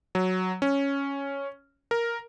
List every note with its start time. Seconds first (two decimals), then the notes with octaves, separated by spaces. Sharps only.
0.15 F#3
0.62 C#4
1.91 A#4